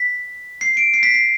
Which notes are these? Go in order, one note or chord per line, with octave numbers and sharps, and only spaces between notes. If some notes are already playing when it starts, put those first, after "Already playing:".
Already playing: B6
C7
D7
C7
B6
C7